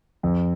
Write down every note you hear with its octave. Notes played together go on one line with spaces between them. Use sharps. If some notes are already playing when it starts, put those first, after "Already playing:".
F2